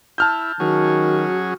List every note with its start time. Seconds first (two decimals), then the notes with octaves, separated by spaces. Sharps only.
0.18 E4 A5 F6 G6
0.60 D#3 F#3 C#4 F#4 G#4